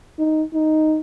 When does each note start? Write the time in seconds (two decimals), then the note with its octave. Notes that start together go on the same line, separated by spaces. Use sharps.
0.19 D#4
0.54 D#4